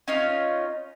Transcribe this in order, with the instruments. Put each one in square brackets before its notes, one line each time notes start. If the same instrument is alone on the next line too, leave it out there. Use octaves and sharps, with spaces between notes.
[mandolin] C#4 D#4 F4